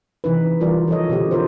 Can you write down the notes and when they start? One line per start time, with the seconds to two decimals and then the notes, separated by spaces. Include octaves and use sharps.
0.24 C3 E3 D#4 B4
0.60 E3 G3 F4 A#4 D5
0.88 F3 A4 C#5 D#5
1.09 B2 D3 C4 G4
1.31 F4 A#4 C5